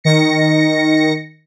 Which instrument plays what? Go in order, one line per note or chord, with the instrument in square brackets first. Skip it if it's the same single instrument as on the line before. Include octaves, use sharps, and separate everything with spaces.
[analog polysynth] D#3 A#6 C#7